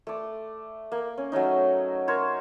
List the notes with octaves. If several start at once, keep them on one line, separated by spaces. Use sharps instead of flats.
A3 D5
A#3
C#4
F#3 A3 C#4 D#4
A#4 C5 C#5